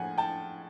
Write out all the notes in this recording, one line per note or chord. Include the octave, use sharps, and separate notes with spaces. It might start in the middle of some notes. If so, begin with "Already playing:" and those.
Already playing: A2 F3 A#3 F#5 G#5
G5 A5